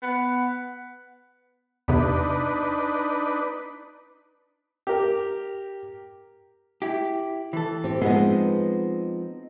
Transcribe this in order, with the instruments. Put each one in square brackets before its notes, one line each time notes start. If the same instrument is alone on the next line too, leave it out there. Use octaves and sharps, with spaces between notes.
[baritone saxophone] B3
[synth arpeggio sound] E2 C3 [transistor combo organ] D4 D#4 B4
[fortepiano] G4 A#4
[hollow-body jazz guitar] E4 G4
E3 A4
[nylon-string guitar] C4 G4
[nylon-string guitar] F3 G#3 B3 [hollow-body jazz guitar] C4 D#4